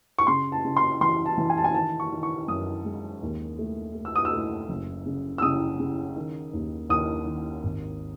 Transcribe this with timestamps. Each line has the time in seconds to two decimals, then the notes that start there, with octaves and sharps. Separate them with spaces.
0.19 C#6
0.27 C#3 C6
0.52 A5
0.64 C#3
0.77 C6
1.01 E3 C6
1.26 A5
1.38 E3
1.50 G#5
1.58 A5
1.64 G#5
1.74 D#3 A5
2.00 C#6
2.12 D#3
2.23 C#6
2.48 F#2 D#6
2.85 G#3
3.22 D#2
3.59 A3
3.95 A3
4.05 E6
4.16 D#6
4.25 E6
4.32 A3
4.69 F#1
5.06 C#3
5.38 E6
5.42 C#3 D#6
5.80 C#3
6.16 D#3
6.53 D#2
6.90 D#2 D#6
7.26 D#3
7.63 G#1